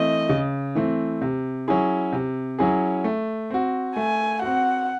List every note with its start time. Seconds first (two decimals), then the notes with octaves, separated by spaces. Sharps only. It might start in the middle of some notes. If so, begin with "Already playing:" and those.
Already playing: E3 A3 C4 D#5
0.29 C#3
0.75 E3 A3 C4
1.22 C3
1.68 F#3 C#4 E4 G#4
2.12 C3
2.59 F#3 C#4 E4 G#4
3.04 A3
3.51 C4 F#4
3.96 A3 G#5
4.42 C4 F#4 F#5